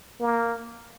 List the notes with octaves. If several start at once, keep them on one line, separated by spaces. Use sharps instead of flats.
A#3